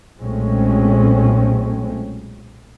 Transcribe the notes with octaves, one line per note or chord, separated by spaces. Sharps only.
B1 A#2 G#3 A3 C4 C#4